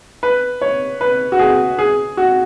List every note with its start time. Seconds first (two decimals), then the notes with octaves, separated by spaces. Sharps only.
0.23 B4
0.61 C#5
1.01 B4
1.32 F#4
1.39 G#4
1.79 G#4
2.17 F#4